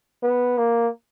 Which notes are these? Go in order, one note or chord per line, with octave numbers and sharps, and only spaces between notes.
B3
A#3